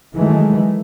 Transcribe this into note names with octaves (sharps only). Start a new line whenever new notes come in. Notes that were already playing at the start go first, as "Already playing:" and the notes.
D#3 E3 F#3 G#3 A3